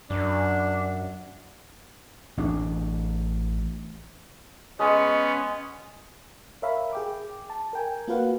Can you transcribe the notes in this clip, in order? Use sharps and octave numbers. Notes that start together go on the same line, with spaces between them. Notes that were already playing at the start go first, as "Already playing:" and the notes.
F#2 D4
A1 D4
G#3 B3 C#4
A#4 C#5 E5 F5 B5
G#4 G5 D6
A5
A#4 G5 G#5
A#3 F4 F#4 B4 F5 F#5